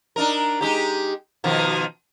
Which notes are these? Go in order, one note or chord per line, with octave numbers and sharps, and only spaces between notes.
D4 D#4 A#4
G#3 D#4 G4
B2 D#3 F3